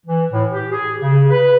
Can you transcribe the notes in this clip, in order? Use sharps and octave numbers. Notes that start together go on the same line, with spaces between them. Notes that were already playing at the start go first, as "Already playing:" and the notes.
E3
A2
G4
G#4
C#3
B4